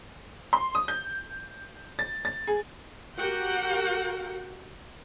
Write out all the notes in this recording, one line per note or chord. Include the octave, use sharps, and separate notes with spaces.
C6
D#6
G6
A6
A6
G#4
F#4 G4 A#4 F#5 G5